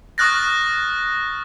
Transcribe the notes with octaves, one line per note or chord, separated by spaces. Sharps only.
C#6 D#6 F6 F#6 A6 A#6